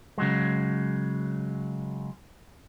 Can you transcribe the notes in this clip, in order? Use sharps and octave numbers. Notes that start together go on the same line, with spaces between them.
C#3 F#3 G#3